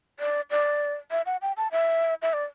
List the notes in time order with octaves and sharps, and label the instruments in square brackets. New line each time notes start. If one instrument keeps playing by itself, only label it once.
[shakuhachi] D5
D5
E5
F#5
G5
A5
E5
E5
D5